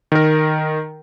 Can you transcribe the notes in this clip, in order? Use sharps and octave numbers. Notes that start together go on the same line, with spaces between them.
D#3 A#4